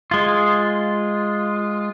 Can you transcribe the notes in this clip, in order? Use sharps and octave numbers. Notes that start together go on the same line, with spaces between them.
G#3 F4